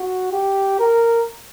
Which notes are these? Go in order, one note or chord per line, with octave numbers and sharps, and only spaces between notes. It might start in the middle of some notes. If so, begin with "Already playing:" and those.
Already playing: F#4
G4
A#4